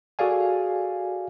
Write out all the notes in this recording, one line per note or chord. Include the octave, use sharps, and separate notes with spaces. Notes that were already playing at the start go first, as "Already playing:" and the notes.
F#4 G#4 A4 D5 F5 G#5